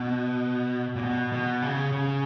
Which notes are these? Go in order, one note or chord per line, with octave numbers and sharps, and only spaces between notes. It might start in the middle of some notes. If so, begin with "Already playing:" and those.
Already playing: B2
A#2
B2
B2
C#3
C#3